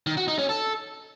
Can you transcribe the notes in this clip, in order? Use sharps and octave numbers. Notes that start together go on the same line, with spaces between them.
D#3
F#4
D#4
C#4
A4